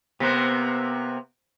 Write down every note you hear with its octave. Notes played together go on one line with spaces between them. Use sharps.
C3 A#3 B3 C5 F#6 A#6 B6